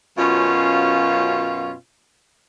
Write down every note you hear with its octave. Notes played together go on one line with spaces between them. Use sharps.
F#2 B2 C#4 F4